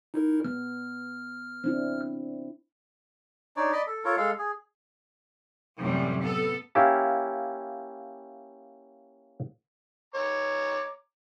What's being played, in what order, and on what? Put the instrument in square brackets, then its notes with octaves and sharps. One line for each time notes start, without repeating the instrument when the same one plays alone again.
[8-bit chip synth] D#4 E4 A#4
[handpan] B3 [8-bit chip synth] F6
[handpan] C4 D4 E4
[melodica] D4 D#4 C#5 D5
D5 D#5 B5
A4
F4 A4 A#4 C#5
G#3 A4 F5
G#4
[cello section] F#2 A2 C3 E3 G3
B3 A4
[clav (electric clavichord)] A#3 C#4 E4 G4 F5 A5
[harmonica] C#5 A#5 D6